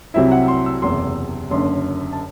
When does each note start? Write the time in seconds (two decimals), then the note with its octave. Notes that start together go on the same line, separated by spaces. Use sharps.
0.14 C2 C3 F#3 C4 E4 E5
0.32 F#5
0.48 C6
0.66 E6
0.82 F#1 E2 C3 C6
1.50 F#1 F#2 D3 C6
2.13 A5